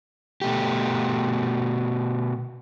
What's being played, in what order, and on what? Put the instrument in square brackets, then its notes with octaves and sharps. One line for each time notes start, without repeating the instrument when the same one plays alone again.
[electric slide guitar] B2 A3 G4